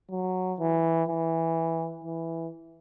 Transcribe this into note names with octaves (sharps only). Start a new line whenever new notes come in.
F#3
E3
E3
E3